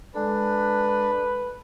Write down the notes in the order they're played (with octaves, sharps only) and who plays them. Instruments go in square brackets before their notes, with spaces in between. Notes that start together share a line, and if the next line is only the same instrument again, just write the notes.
[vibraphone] G#3 A4 [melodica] D4 [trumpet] B4